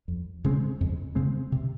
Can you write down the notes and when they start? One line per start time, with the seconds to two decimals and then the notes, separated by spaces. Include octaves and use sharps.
0.08 F2
0.44 C#3 G#3 C4
0.80 F2
1.15 C#3 G#3 C4
1.52 C3